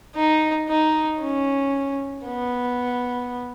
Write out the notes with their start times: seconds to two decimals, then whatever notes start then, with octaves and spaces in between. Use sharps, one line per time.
0.16 D#4
0.69 D#4
1.21 C#4
2.27 B3